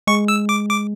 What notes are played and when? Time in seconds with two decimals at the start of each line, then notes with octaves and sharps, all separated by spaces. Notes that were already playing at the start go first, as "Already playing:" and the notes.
0.07 G#3 C#6
0.28 E6
0.49 D6
0.69 D6